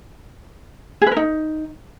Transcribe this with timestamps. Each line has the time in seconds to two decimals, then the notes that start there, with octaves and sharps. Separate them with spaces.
1.02 G#4
1.07 B4
1.12 A#4
1.17 D#4